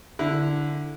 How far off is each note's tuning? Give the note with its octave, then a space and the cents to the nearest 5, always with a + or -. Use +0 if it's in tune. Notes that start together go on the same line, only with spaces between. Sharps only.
D3 +0 E4 +0